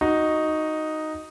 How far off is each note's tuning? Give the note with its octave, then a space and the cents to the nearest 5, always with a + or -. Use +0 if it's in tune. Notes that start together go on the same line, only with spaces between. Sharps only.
D#4 +0 F#4 +0